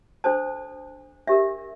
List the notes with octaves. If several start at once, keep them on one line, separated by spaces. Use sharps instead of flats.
D4 A4 C5 A5
D4 G4 A#4 E5